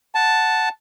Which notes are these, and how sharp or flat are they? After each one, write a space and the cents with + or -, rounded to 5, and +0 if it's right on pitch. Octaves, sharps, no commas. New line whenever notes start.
F#5 +0 A5 +0